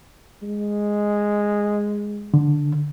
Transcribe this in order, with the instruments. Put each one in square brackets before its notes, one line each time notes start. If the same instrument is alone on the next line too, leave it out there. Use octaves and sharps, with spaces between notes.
[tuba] G#3
[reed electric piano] D3